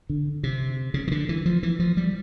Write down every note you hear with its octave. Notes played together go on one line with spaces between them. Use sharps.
D3
C3
C#3
D#3
D3
E3
F3
E3
F3
G3